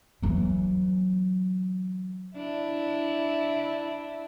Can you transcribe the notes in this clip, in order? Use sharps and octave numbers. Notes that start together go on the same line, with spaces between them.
E3 F#3
D4 E4